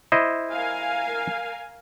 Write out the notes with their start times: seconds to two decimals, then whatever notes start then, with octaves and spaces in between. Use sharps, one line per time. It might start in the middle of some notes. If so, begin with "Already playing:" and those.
0.12 E4 C5 D#5
0.51 A#4 F5 G#5